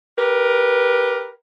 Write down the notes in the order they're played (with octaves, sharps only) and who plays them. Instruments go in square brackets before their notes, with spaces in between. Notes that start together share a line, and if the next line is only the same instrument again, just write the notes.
[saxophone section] G4 A#4 B4